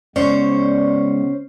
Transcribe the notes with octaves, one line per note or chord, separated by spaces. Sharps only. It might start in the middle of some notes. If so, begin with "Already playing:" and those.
C#3 G#3 B3 C#4 C5 D5 C#6